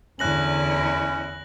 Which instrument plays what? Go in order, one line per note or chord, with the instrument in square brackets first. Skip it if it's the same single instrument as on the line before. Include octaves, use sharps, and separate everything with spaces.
[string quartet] E2 E4 [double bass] D3 [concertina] C#4 [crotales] F#6 A#6 F#7